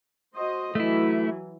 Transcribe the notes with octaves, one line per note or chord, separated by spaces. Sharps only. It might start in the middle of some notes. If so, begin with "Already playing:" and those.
F#4 C5 D#5
E3 F#3 A3 E4